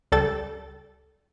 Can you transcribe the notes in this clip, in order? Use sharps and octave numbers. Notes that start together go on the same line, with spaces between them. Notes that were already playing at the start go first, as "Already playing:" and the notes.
C#2 G3 A4 G5 A6